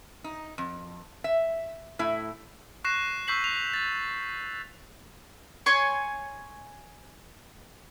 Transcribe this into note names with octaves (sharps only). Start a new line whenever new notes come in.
D#4
F2
E5
A2 E4
C#6 F#6 A#6 C7 E7
C#6 E6 G6 B6 C7 F#7
F7
A6
C#5 G#5 C6 C#6